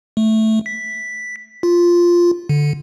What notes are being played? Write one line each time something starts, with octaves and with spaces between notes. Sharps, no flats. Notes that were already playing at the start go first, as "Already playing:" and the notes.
A3
B6
F4
D3